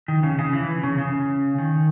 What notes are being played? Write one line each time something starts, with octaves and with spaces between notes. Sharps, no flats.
D#3
C#3
C#3
E3
C#3
C#3
D#3